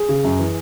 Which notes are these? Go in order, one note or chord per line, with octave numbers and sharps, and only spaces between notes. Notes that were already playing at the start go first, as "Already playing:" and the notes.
Already playing: G#4
C#3
F#2
E3